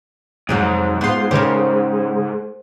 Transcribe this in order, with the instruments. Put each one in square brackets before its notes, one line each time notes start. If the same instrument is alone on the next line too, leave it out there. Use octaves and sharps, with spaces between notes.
[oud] F2 C3 F#3 [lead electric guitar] G#2
[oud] B3 F4 [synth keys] C5 C6
[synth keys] C#3 G4 [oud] A#4 C5